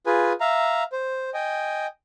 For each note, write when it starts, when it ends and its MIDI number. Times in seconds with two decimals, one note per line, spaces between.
0.06 0.33 65
0.06 0.33 68
0.06 0.33 71
0.06 0.33 80
0.41 0.83 76
0.41 0.83 77
0.41 0.83 82
0.92 1.30 72
1.34 1.87 75
1.34 1.87 79
1.34 1.87 80